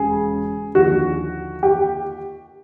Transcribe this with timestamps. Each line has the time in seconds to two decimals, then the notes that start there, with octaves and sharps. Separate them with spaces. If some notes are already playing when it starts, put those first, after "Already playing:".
Already playing: E1 C#3 G#4
0.75 D#2 D3 F3 F#4
1.63 G4